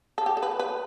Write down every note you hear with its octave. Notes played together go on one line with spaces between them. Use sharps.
A4
G4
A4
B4
B4